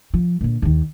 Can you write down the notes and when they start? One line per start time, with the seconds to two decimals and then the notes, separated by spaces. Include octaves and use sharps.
0.14 F3
0.41 A#2 D3
0.62 D#2 D#3